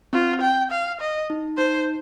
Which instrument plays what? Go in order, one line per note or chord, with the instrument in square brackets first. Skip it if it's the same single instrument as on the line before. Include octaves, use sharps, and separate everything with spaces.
[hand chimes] C4 [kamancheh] F4
[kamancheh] G5
F5
D#5
[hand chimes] D#4
[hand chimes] D#4 [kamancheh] C5